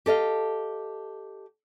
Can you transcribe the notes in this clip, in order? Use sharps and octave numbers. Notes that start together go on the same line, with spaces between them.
G4 A4 D#5 F5